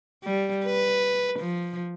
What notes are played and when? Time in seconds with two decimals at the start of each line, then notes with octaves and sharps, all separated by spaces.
0.23 G3
0.65 B4
1.40 F3